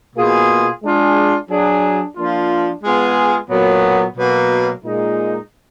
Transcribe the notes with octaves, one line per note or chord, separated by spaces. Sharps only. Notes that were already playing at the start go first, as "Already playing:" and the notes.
B2 A#3 F4 G#4
G#3 D4 F4 G#4
F#3 D4 G#4
F3 A#3 D4 F4
G#3 B3 F4 G#4
A#2 F#3 B3
B2 F#3 A#3
A#2 G#3 D#4